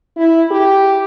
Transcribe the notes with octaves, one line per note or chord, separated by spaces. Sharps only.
E4
G4